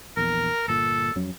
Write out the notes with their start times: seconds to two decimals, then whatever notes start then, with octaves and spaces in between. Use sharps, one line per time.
0.17 A#1 E2 A#4
0.68 G1 A#2 A4
1.16 F2 F#3 C#4